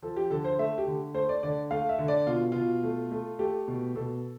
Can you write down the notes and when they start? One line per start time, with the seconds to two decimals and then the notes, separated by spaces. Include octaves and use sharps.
0.02 F3 A4
0.16 G4
0.30 D3 A4
0.44 C5
0.59 A3 E5
0.78 G4
0.87 D3
1.14 A3 C5
1.29 D5
1.43 D3 D5
1.71 A3 F5
1.89 E5
1.98 D3
2.08 D5
2.27 B2 F4
2.52 B2 F4
2.83 A3
3.11 A3
3.39 A3 G4
3.68 B2
3.95 B2 A4